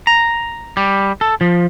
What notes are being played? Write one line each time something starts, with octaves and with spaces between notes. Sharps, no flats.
A#5
G3
A4
F3